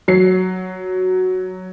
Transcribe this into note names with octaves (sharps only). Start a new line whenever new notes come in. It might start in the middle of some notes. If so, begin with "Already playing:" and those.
F#3 C7